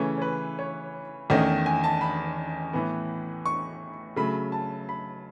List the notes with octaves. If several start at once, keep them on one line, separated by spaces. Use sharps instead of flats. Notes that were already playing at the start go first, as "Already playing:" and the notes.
Already playing: C#3 E3 A3 C#4 C#5
C#5
B4
C#5
E2 D#3 A3 C#4 D#5
G#5
A5
B5
A2 E3 B3
C#6
C#3 F#3 A3 B5
A5
B5